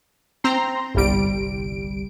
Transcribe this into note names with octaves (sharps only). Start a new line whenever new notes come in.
C4 A#5 C6
G1 C2 G3 D7